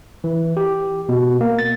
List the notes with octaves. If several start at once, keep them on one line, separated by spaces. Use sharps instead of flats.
E3
G4
B2
A#3
A6